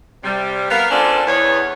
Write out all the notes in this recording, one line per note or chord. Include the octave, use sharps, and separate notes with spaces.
C3 G3
B3 A#4 F5
C#4 D4 F4 A4 C5 D5
E2 B3 C#5